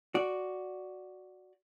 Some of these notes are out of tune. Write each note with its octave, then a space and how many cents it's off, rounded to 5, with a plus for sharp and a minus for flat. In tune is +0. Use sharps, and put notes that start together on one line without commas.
F#4 +0 D5 +0